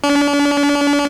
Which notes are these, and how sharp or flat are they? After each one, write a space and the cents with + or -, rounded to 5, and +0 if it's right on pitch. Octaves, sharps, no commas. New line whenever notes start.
D4 -40